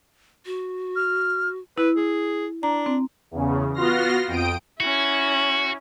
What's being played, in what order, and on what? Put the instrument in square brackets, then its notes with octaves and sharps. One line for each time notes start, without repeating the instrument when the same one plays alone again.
[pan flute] F#4
[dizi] F6
[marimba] E4 [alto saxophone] B4
[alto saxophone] G#4
[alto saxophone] D4 [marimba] A#5
[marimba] C4
[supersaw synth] E2 C#3
B3 F4 F#4 C6 F6 A#6
F2 G5 D#6 D7
[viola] C#4 E4 [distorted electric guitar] F#4